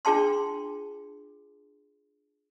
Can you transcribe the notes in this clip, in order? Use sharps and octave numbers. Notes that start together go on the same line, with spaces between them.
D4 F4 G#4 G5 A5 C6